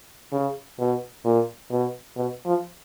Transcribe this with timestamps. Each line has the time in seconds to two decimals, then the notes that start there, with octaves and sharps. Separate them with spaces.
0.33 C#3
0.79 B2
1.25 A#2
1.71 B2
2.16 B2
2.46 F3